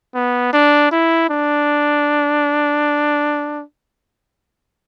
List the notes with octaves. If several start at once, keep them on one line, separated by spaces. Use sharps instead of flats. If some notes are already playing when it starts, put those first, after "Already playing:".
B3
D4
E4
D4